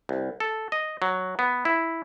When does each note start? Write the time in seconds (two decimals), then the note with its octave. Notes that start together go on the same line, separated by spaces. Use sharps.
0.09 C2
0.40 A4
0.72 D#5
1.02 F#3
1.39 B3
1.65 E4